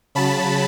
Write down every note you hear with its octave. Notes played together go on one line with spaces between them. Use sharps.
C#3 F#3 A5 B5